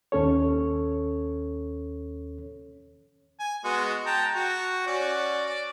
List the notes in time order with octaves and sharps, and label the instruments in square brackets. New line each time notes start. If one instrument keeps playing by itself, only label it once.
[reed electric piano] D#2 C#4 A4 C#5
[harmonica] G#5
G#3 B3 F#4
G5 A5 A#5
F#4
C#4 F#4 D5
D5